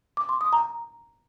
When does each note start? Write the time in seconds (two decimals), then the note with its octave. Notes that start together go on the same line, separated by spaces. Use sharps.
0.17 D6
0.29 C6
0.41 D#6
0.53 A#5